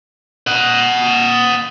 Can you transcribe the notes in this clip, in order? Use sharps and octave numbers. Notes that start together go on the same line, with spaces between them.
D#5 F#5